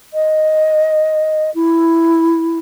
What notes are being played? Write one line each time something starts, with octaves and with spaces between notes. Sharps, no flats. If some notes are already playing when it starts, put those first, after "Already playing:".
D#5
E4